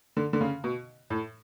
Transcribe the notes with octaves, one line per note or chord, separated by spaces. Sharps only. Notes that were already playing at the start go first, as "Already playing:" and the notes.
D3
D3
C#3
B2
A2